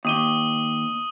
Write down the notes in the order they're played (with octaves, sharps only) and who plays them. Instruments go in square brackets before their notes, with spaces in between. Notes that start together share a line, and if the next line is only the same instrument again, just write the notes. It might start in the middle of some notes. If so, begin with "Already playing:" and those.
[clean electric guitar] D#2 [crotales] D#6 D#7 G7